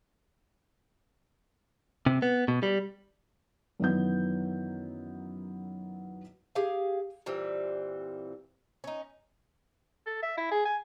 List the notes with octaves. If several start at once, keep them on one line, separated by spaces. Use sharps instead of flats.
C3
B3
B2
G3
F#2 D#3 E3 F#3 B3 G6
G4 G#4 F5
A#2 E3 G3 C4
C#4 D#4
A4
E5
E4
G#4
G#5